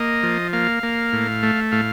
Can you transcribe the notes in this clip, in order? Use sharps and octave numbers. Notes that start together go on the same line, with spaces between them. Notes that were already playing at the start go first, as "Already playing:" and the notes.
Already playing: A#3 D#5
F3
A#3 F5
A#3
A2
A3
A2 F5